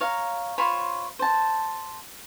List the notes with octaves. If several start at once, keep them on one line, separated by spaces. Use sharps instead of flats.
C#5 F5 A#5
F4 C5 C#5 B5
C5 A5